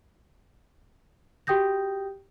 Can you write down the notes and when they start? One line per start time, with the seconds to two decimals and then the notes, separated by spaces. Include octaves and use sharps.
1.47 F#4 G4 G5 D#6 G6 A#6